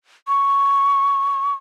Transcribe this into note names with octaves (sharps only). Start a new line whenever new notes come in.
C#6